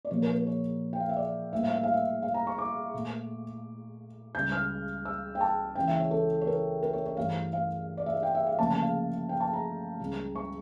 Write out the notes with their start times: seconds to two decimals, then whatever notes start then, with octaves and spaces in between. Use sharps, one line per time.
0.05 D5
0.11 A#2 F3 A#3 C#5
0.22 A#4
0.35 A#4
0.47 C#5
0.93 G5
1.00 F5
1.09 E5
1.16 D5
1.53 A2 G3 A#3 E5
1.63 F5
1.73 E5
1.83 F5
1.94 E5
2.22 F5
2.34 A#5
2.47 C#6
2.58 D6
2.94 A#2 A3
4.35 C#2 C#3 G3 G6
4.52 F6
5.05 E6
5.35 G5
5.41 A5
5.75 C#2 C#3 E3 G5
5.87 E5
6.00 C#5
6.11 A4
6.41 C#5
6.47 A#4
6.83 A#4
6.93 C#5
7.06 C#5
7.17 G2 E3 A3 F5
7.53 F5
7.97 D5
8.06 E5
8.15 F5
8.23 G5
8.35 E5
8.47 F5
8.58 D2 C#3 F3 A#3 A5
8.70 A5
8.82 F5
9.29 G5
9.40 A5
9.53 A#5
10.00 C#2 C#3 G3
10.35 C#6